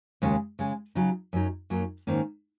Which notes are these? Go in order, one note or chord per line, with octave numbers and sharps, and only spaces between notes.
D#2 C#3 G#3 C#4
C#3 G#3 C#4
C#3 F#3 D#4
F#2 F#3 D#4
F#2 F#3 A#3 D#4
G#2 D#3 A#3 C#4